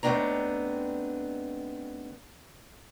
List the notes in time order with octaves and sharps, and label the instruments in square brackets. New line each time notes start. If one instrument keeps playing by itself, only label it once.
[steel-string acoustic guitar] D#2 A3 B3 C4 D4 A#5